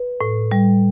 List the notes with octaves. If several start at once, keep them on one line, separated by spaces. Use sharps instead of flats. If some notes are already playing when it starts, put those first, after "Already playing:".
Already playing: B4
A2
G3